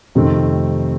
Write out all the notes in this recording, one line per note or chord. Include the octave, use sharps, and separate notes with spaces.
F2 C3 D#3 A3 C4